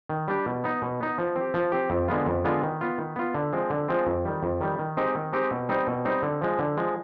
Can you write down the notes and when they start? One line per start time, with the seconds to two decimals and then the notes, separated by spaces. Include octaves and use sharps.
0.09 D#3
0.28 G3 D4 G4
0.46 B2
0.64 B3 D#4
0.82 B2
1.01 B3 D#4
1.18 F3
1.36 C4
1.41 G4
1.54 F3
1.72 C4 G4
1.90 F2
2.08 D3 G#3 B3 F4
2.26 F2
2.44 D3 G#3 B3 F4
2.63 D#3
2.81 B3 F4
2.98 D#3
3.16 B3 F4
3.35 D3
3.53 F3 G#3 C4
3.70 D3
3.88 F3 G#3 C4
4.07 F2
4.25 D#3 G3
4.43 F2
4.61 D#3 G3
4.79 D#3
4.97 G#3 C4 D#4 G4
5.15 D#3
5.33 G#3 C4 D#4 G4
5.51 B2
5.69 G3 C4 D#4
5.87 B2
6.05 G3 C4 D#4
6.23 D3
6.42 F3 G#3
6.59 D3
6.77 F3 G#3